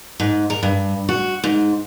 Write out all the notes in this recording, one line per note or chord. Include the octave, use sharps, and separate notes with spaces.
G#2
A#4
G2
F#4
G#2